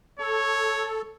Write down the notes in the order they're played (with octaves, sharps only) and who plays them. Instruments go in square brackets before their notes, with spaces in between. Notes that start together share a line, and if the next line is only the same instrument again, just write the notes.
[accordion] A4 [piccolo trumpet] C#5